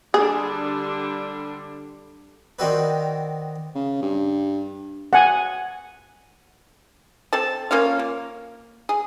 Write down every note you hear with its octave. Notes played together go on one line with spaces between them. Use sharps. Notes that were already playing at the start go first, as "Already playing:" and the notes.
D3 G3 D4 G#4
D#3 C4 D4 F#4 A4 B4
C#3
G2
F#5 G#5
C4 A4 A5
A#3 C#4 F4 F5
A#3
G#4